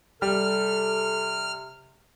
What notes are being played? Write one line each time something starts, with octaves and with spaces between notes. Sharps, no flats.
C3 G3 A4 F6